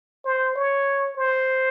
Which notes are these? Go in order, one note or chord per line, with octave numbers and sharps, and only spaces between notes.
C5
C#5
C5